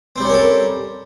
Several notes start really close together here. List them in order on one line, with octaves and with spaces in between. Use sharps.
C4 G3 C#4 A#4 A4